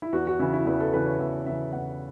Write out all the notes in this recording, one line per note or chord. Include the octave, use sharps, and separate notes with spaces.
E4
E2 F#4
F#4
C#3 E3 E4
E4
E2 B4
A4
C#3 E3 B4
C#5
E2 E5
C#3 E3 E5
E2 F#5